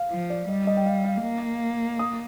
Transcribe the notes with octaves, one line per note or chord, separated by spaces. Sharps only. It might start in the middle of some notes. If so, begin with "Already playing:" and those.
Already playing: F5
F3
D5
G3 D#5
D#5
G5
F5
F5
A#3
D#6